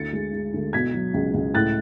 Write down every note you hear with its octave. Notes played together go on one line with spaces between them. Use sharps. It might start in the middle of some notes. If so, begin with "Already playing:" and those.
Already playing: D2 A6 C#7
G#3
G#3
D2
B2 G#6 B6
F#3
C#2
C#2
A2 F#6 A6